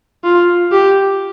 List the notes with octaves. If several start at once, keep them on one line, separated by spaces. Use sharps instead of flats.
F4
G4